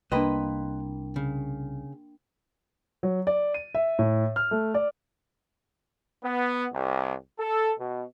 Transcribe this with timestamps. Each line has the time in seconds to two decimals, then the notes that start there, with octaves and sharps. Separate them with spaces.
0.12 C2 A#3 D4 B4 D#5 G5 B5 C6
1.16 C#3
3.03 F#3
3.27 D5
3.54 D#7
3.75 E5
3.99 A2
4.36 F6
4.51 A3
4.74 D5
6.24 B3
6.73 C2
7.39 A4
7.79 B2